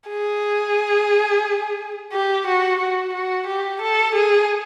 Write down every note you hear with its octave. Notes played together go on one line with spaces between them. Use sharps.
G#4
G4
F#4
F#4
F#4
G4
A4
G#4